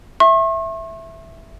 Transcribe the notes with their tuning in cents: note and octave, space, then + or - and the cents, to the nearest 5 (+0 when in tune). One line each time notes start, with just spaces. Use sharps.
E5 +0 C#6 -45